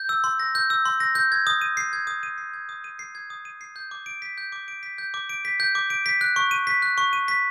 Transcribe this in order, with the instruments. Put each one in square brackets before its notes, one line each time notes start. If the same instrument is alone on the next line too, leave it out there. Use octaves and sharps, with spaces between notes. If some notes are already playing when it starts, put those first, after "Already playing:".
Already playing: [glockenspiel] G6
E6
C6
A#6
G6
E6
C6
A#6
G6
G#6
D#6
D#7
C7
G#6
D#6
D#7
C7
G#6
D#6
D#7
C7
G#6
D#6
D#7
C7
G6
D6
D7
B6
G6
D6
D7
B6
G6
D6
D7
B6
G6
D6
D7
B6
F#6
C#6
D#7
B6
F#6
C#6
D#7
B6